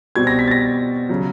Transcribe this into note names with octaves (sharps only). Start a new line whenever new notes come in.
B2 G3 C4 G#6
A#6
B6
A6
A#6
C#3 F#3